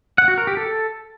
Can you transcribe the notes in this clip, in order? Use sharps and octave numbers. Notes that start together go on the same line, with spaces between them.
F#5
F#4
A#4
G4
A4